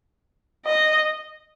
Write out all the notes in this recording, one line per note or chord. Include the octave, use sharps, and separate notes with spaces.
D#5